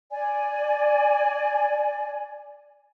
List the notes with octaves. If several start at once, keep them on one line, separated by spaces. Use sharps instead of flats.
D5 G#5